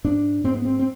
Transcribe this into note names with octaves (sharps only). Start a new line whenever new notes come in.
G#2 D4
G#2 C4
B3
C4
C4